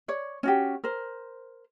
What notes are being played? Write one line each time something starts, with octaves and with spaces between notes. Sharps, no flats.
C#5 D5
C#4 F#4 G4
A#4 C5